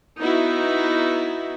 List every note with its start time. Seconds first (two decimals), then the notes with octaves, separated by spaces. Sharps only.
0.20 B3 D#4 E4 F#4